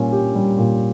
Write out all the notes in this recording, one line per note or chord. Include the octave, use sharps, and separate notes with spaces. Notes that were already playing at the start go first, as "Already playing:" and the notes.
Already playing: A#2 G3 C#4
G4
G3
A#2